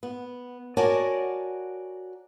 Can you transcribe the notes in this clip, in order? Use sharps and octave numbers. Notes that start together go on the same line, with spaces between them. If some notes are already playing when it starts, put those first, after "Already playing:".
B3
F#4 A#4 C#5 D5 G#5 A5